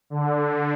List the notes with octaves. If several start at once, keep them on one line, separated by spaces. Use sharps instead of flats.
D3